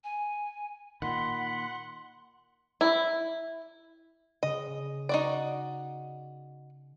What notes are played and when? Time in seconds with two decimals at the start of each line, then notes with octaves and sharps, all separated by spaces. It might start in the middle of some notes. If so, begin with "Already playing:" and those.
0.04 G#5
1.02 A#2 D#3 F#5 B5 C6
2.81 E4
4.43 C#3 D#5
5.09 D#4 F#4 D5